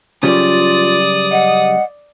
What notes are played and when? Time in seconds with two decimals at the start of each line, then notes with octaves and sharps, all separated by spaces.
0.23 C#3 F#3 G3 F4 D5 D#6
1.32 D#5 F#5